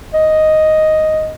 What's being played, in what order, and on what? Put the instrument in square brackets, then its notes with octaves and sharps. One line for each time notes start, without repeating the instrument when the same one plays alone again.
[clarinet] D#5